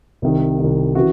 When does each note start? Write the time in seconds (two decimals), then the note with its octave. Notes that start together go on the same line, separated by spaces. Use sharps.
0.22 C2 C3 D#3
0.59 C2 C3 D#3
0.95 C#3 E3 F#4